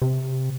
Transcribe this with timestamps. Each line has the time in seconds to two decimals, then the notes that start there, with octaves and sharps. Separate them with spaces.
0.02 C3